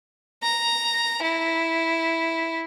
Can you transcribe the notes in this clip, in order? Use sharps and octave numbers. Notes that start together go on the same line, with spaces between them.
A#5
E4